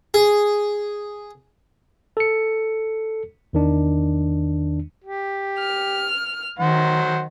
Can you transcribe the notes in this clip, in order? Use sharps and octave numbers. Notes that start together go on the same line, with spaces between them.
G#4
A4 C#7
E2 D#3 D4
G4
F6
D#3 F#3 C5 F#5